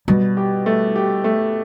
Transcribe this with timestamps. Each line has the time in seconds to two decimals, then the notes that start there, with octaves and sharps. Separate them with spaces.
0.08 B2 G3
0.37 G4
0.66 A3
0.96 G4
1.24 A3